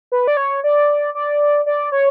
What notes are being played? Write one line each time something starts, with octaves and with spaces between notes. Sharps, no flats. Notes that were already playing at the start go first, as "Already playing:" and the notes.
B4
D5
C#5
D5
D5
D5
C#5